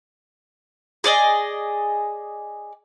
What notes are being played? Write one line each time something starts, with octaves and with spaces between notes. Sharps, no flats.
G#4 D5 D#5